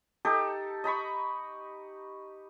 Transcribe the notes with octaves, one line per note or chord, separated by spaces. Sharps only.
D#4 G4 A4 A#5
D#5 A#5 B5 C#6